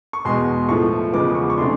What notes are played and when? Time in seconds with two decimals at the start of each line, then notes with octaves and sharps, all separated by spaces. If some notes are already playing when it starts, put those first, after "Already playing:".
0.13 C#6
0.25 E2 B2 G#3 C6
0.68 A2 F3 A3 C#6
1.13 E2 C#3 F3 G#3 B3 D6
1.35 C#6
1.50 C#6
1.57 C3 E3 A3 D4 C6